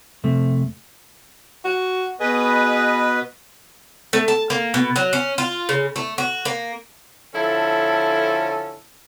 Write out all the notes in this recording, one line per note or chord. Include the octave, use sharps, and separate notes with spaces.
F2 C3 A3
F#4
B2 G#4 B4 D#5
A3
A5
A#3
B2
F#3
C#4
F4
C#3
A3
F#4
A#3
D3 F3 C#4 E4 A4